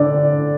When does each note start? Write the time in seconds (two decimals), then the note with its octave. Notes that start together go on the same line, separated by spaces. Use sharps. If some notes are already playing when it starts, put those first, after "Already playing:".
Already playing: D3 D5